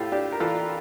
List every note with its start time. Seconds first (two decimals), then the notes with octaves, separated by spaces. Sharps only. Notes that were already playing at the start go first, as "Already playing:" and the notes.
Already playing: A2 F4 G4 A4
0.12 D4 G4
0.32 A#4
0.40 E3 F4 A4